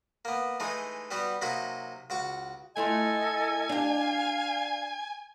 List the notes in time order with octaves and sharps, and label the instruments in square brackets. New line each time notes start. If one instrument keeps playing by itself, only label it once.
[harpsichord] A#3 B3
E3 G#3 A3 D#4
G3 B3 F#4 G4
C3 F#3 A#3 D#4 B5 C#6
C#2 F#4 C#6 D6
[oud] A3 E4 F4 [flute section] A4 D#5 [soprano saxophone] G#5
[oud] D4 G4 [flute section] F5